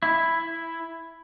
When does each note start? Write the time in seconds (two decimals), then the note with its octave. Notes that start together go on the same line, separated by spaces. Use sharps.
0.03 E4